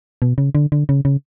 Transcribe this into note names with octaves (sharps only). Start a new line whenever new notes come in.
B2
C#3
D3
D3
C#3
C#3